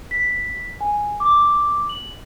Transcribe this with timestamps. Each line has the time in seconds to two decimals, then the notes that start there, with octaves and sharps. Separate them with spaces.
0.11 B6
0.81 G#5
1.20 D6
1.89 F#7